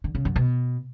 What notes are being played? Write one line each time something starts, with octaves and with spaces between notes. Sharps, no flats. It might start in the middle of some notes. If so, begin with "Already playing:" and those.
D3
C#3
F#2
B2